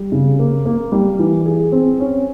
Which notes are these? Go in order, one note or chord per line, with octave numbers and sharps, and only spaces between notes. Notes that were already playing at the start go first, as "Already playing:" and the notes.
Already playing: G3
C#3
A#3
A#3
G3
E3
G#4
C4
C#4